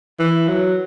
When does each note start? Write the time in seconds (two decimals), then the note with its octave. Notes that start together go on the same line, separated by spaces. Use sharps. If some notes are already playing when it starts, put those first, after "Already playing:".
0.20 E3
0.48 F#3